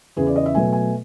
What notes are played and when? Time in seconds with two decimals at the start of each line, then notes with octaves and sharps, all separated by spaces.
0.16 E2 C#3 E3 G#4
0.27 D5
0.36 D#5
0.46 E5
0.55 B2 F#3 A3 G#5
0.73 G#5